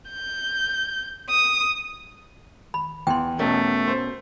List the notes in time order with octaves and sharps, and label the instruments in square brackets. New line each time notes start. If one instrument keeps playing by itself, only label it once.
[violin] G6
D#6
[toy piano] B5
[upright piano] E2 [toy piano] G5 C6
[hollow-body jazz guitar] B2 C#4 A#4 [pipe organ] A3
[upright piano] C5